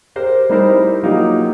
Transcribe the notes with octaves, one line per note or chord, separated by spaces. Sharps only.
G4 A#4 C5
G3 D#4 E4 A#4 C5 D5
F#3 A#3 D#4 F4 G4